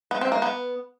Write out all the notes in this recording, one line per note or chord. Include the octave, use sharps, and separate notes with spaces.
B3
C4
A#3
B3